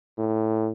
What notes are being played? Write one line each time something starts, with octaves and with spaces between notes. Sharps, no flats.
A2